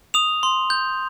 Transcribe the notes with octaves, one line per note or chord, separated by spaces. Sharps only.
D#6 F7
C6
G6